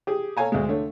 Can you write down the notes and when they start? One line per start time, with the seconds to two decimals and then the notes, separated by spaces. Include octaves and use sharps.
0.07 G4 G#4
0.37 A4 C#5 F5 G#5 A#5
0.52 D2 G#3
0.69 D3 A3 C#5